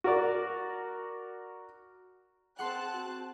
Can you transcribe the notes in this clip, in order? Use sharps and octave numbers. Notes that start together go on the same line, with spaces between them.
F#4 A#4 D5
C4 G#4 F#5 A5 C6 F#6
F#4